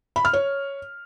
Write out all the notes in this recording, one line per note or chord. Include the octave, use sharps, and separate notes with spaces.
B5
F6
C#5